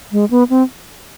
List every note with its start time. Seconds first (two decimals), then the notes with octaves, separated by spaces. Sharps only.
0.12 G#3
0.30 B3
0.50 C4